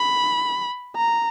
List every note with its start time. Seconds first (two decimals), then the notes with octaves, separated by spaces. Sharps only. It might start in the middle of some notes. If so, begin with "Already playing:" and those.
Already playing: B5
0.97 A#5